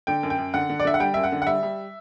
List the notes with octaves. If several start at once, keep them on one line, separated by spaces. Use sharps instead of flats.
D3 G5
F#2
G5
F#2
D3 F#5
D3
D5
D3 E5
F#5
G3 G5
F#2 E5
F#5
D3
F#5
G3 E5
G3